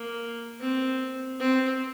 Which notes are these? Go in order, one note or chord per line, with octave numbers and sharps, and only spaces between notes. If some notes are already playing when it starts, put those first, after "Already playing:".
Already playing: A#3
C4
C4